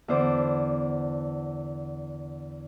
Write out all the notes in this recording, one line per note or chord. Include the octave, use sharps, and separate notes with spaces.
E2 D3 C5 D6